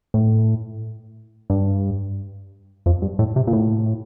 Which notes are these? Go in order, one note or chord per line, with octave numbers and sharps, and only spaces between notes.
A2
G2
F2
G2
A2
C3
A#2
A2